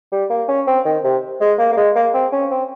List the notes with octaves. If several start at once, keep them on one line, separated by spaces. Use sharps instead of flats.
G3
A#3
C#4
C4
D#3
C3
G#3
A#3
A#3
G#3
A#3
C4
C#4
C4